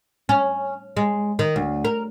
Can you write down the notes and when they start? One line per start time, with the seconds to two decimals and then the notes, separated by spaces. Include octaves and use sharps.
0.29 C#4
0.97 G#3
1.39 D#3
1.56 D2
1.85 A#4